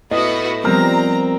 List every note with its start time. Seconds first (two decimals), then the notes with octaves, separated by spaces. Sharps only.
0.11 A2 B3 F#4 D#5
0.65 F3 G3 B3 C4 A#4 A#5